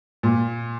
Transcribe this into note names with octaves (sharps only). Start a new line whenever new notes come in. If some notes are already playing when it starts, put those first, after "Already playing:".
A#2